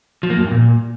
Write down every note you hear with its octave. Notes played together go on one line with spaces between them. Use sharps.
F3
A#3
F#2
G2
A#2